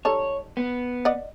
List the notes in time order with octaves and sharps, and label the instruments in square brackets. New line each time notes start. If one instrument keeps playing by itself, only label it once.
[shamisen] G3 D#4 A4 [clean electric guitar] C#5
[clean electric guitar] B3
[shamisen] D5 D#5 F#5